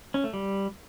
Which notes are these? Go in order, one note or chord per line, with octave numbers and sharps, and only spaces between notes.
C#4
A3
G3